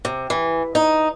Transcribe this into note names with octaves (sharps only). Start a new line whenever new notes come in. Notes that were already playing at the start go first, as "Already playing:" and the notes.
C3
E3
D#4